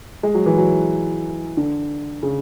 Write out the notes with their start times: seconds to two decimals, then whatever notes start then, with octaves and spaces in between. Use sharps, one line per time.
0.23 G#3
0.35 F#3
0.46 E3
0.57 F#3
1.57 D3
2.23 C#3